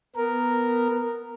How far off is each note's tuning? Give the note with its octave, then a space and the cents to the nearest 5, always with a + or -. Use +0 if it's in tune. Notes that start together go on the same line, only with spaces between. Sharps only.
B3 +0 A#4 -5